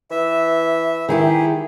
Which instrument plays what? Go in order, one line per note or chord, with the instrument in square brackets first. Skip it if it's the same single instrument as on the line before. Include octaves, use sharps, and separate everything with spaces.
[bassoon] E3 [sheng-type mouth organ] E5
[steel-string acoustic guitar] D#3 E4 G4 [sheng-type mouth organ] G#4